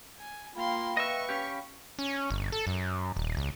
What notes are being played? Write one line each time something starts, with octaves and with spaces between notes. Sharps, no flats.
G#5
A#3 F4 F5 G5 B5 C6
B4 D#5 E5 C#6
C#4 G4
C#4
G1
A4
F#2
D#1
C#2